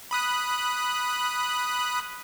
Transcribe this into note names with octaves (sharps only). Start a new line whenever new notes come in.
B5 D#6 F#6